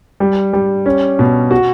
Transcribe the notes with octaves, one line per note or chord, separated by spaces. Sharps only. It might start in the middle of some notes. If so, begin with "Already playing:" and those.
G3
G3
C#4
B2
F#4